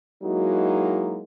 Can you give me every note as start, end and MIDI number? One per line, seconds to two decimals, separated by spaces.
0.23 1.23 54
0.23 1.23 56
0.23 1.23 58
0.23 1.23 63
0.23 1.23 64
0.23 1.23 66